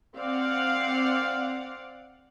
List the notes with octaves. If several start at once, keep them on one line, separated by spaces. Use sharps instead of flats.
C4 D5 F5 F#5